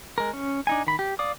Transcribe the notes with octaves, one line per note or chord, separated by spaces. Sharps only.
G#3 A#4
C#4
D4 D#4 G#5
D#3 B5
G4
D5 F5 D6 D#6